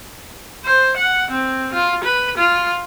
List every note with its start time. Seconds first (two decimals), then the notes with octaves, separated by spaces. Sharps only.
0.65 C5
0.97 F#5
1.31 C4
1.73 F4
2.04 B4
2.37 F4